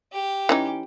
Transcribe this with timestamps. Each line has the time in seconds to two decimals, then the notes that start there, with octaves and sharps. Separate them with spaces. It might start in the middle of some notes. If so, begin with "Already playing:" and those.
0.13 G4
0.49 E3 C#4 D#4